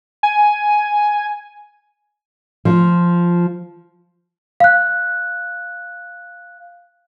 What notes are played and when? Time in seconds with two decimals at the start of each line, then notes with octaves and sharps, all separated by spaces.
0.23 G#5
2.65 F3
4.60 F5 F#6